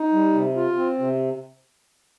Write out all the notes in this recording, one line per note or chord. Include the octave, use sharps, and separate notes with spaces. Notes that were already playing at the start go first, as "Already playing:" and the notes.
Already playing: D#4
G3
C3
F4
C4
C3